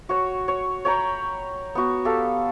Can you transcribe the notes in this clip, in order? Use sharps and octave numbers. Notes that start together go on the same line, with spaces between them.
F#4 C#5
C#5
C#5 G5 A#5 B5
B3 F#4
G4 A4 F5